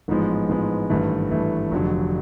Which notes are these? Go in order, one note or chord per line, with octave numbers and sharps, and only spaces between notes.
A1 G#2 F3 G#3 B3
A1 G#2 F3 G#3 B3
G#1 G2 E3 A3
G#1 G2 E3 A3
F1 F2 D3 F#3